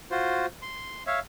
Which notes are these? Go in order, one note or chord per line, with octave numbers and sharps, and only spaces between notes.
F4 F#4 C5
C6
C#5 E5 F5